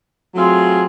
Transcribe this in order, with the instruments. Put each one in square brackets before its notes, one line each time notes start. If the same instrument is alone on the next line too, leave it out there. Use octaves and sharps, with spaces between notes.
[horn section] F#3 A3 C4 F4 G#4